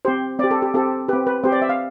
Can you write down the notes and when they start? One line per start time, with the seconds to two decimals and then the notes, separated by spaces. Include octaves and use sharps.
0.05 C4 G4 C5
0.39 C4 D5
0.44 G4
0.51 A4
0.62 G4
0.74 C4 G4 A4
1.08 C4 G4 B4
1.27 B4
1.44 C4 G4 C5
1.52 D5
1.62 E5
1.69 F5